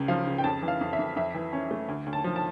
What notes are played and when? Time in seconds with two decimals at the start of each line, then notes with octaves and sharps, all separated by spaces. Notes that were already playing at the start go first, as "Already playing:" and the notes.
Already playing: C#2 C#3
0.08 F3 F5
0.26 C#3
0.38 G5
0.44 F2 A5
0.63 E3
0.68 F5
0.81 F2
0.93 E5
0.99 F2
1.16 F2 E5
1.34 E3
1.52 C#4
1.71 A3
1.88 D2
2.06 D2
2.13 A5
2.24 F3
2.36 A5